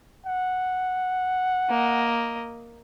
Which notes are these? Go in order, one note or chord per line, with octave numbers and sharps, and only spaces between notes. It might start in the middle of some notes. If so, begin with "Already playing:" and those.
F#5
A#3 D#5